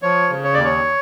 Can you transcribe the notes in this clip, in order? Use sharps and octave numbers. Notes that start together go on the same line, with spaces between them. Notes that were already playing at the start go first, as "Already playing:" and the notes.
F3 C#5
C#3
C#5
D#2 D5
C#5